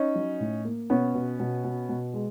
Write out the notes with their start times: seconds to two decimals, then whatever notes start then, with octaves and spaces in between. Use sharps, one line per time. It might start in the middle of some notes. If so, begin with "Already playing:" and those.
Already playing: C#4 D#4
0.15 F#3
0.40 A2
0.65 A#3
0.90 B2 B3 C#4
1.15 B2
1.40 B2
1.65 B2
1.89 B2
2.14 G#3